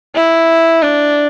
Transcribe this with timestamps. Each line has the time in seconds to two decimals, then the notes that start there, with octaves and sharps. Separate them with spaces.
0.15 E4
0.82 D4